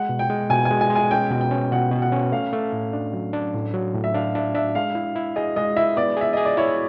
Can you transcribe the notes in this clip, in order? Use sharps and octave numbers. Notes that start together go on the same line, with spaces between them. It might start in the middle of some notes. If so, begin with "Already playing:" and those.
Already playing: G#3 F#5
B2
G5
G#3
B2 G#5
G#5
G#3
G#5
G#3
G#5
C#4 G5
B2
G5
C#4
B2 F#5
B2
F#5
C#4
A3 F5
A3
A2
D4
F#3
D4
A2
F#3
A2
E5
D4 F5
D4 E5
D4 E5
G#3 F5
E4
E4
G#4 D#5
G#3 D#5
E4 E5
B3 D5
G#4 E5
G#4 D#5
D5
E4 C#5